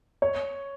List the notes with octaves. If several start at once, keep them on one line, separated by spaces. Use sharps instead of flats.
C#5